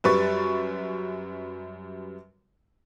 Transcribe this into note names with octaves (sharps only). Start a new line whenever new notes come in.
F#2 G3 B4 C#6 A6